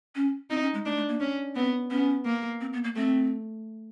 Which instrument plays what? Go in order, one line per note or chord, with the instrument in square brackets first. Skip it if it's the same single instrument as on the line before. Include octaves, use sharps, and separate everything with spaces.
[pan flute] C#4
[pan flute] C4 [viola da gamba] D#4
[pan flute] C#4
G#3
[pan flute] A3 [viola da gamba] D4
[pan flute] A3
A#3
[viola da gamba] C#4
[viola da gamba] B3 [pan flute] C4
[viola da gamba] B3 [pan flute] C#4
[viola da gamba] A#3
[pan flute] C4
B3
A#3
[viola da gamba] A3 [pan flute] C4